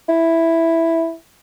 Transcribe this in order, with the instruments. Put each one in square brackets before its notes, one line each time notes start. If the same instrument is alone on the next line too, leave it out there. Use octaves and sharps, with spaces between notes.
[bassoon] E4